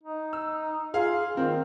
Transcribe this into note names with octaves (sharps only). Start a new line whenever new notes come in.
D#4
E6
F4 G#4 F5
D#3 C4